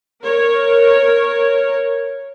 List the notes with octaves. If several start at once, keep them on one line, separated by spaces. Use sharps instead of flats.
A#4 C#5